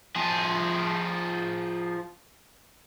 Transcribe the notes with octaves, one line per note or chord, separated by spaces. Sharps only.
F3 G#4